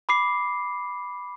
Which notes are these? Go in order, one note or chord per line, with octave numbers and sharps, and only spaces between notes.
B5 D6 C7